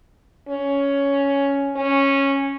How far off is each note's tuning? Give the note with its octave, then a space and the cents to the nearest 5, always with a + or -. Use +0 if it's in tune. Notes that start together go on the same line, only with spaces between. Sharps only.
C#4 +10
C#4 -10